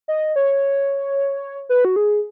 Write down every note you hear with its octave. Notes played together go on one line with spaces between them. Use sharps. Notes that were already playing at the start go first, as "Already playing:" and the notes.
D#5
C#5
B4
F#4
G#4